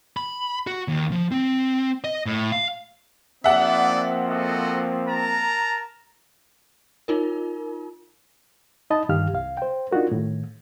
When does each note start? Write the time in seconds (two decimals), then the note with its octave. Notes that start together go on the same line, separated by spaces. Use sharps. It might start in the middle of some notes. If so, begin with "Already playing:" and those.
0.17 B5
0.67 F#4
0.88 D#2
1.12 F3
1.31 C4
2.04 D#5
2.26 A2
2.52 F5
3.44 F3 A#3 C4 D4 D#4 D5 E5 F#5
4.29 F#4 A4 D#5
5.06 A#4 A5 A#5
7.08 D#4 F4 A#4
8.90 D#4 D#5 A5 B5
9.09 C#2 G2 D#3 G4 F5 F6
9.33 C2 F5
9.57 C5 G5
9.91 D4 D#4 F4 F#4 A#4
10.11 A2 D#3